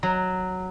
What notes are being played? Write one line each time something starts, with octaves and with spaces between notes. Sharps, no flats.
F#3